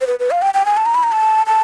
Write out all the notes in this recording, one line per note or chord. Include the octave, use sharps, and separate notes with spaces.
C5
B4
B4
F5
G5
G5
G#5
A5
A#5
B5
A#5
A5
A5